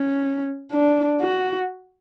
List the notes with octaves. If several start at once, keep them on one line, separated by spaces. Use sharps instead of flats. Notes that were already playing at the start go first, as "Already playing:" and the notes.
Already playing: C#4
D4
F#4